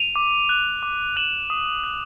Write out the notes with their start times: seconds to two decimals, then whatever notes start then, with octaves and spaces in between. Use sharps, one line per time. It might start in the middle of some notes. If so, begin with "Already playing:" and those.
Already playing: D#7 F7
0.16 D6
0.49 F#6
0.83 D6
1.16 F#6 E7 F#7
1.50 D#6
1.84 F#6